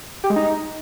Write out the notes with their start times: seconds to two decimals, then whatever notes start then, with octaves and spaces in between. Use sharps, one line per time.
0.24 G4
0.30 G#3
0.36 D#4